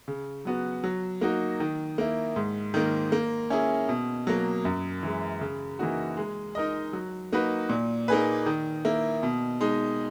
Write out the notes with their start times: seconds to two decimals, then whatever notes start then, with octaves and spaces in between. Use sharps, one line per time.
0.08 C#3
0.45 F#3 B3 F#4
0.84 F#3
1.21 A#3 D#4 F#4
1.60 D#3
1.98 A#3 E4
2.36 G#2
2.74 D#3 A#3
3.12 A#3
3.50 C#4 E4 G#4
3.89 B2
4.27 F#3 A#3
4.65 F#2
5.03 E3 G#3
5.41 C#3
5.79 E3 A#3 D#4 F#4
6.17 G#3
6.55 D#4 A#4 D#5
6.93 F#3
7.33 A#3 D#4 F#4 B4
7.69 A#2
8.08 A#3 D#4 G#4 B4
8.46 D#3
8.85 A#3 E4
9.23 B2
9.61 G#3 D#4